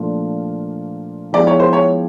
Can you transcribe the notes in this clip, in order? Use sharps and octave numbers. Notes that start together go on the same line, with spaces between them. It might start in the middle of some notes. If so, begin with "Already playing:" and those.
Already playing: A#2 F3 A3 D4 F4
F3 G#3 B3 E4 G4 D5
C#5
C5
C#5